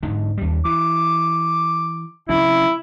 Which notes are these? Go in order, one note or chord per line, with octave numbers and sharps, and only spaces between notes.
G#2 D3
D#2 G3
E3 D6
C#3 F#3 C4 E4